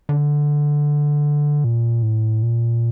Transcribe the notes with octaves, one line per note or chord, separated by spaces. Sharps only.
D3
A#2
A2
A#2